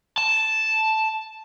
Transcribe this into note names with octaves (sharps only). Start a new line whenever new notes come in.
A5